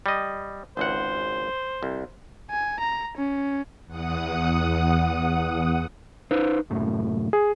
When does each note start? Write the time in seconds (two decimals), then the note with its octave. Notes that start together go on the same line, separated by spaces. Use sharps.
0.06 G3 D#5
0.77 G#1 C#2 C5 F#5
1.83 C2
2.50 G#5
2.80 A#5
3.17 C#4
3.87 E2 F#5 D#6
6.31 D#4 B4 C5
6.70 C2 F#2 A2
7.33 G#4